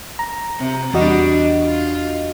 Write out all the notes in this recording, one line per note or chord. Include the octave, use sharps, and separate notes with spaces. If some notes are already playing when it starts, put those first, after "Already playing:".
A#5
C3
E2 G3 D4 F#4 D#5
F4